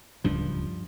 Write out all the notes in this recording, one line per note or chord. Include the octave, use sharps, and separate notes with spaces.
D1 C#2 G2 F3 D4